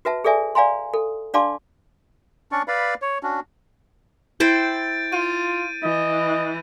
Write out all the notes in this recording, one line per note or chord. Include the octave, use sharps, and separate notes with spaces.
F#4 B4 E5 A5
G#4 A4 D5 E5 G#5
D5 F5 G#5 A#5 C6
A4
D4 D5 F5 A5 C6 D6
C#4 D4 D5 C#6
B4 D5 F5 B5
C#5
C#4 D4 F#4
E4 C5 G5 G6 A6 D7
F4 D#7
E3 D#5